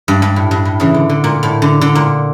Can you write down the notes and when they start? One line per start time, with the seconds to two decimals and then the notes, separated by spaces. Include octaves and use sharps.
0.08 G2
0.22 G2
0.36 A2
0.51 G2
0.65 A2
0.80 C#3 E3
0.94 D3
1.09 D3
1.24 A#2
1.43 A2
1.62 D3
1.81 D3
1.95 A#2